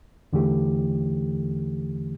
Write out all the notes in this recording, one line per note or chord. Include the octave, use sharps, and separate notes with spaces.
E2 D3 E3 A3 G4